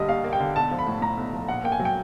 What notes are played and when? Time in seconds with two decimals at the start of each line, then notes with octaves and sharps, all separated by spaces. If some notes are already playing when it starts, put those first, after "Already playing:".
Already playing: D3 G3 A#3 D#5
0.09 D#2 F5
0.24 A#3
0.33 G5
0.40 D3
0.56 B1 A5
0.71 F3
0.79 B5
0.87 A2
1.01 A2 A#5
1.17 B1
1.33 F3
1.48 A#1 F#5
1.64 A#3 G5
1.72 G#5
1.79 F#3
1.85 G5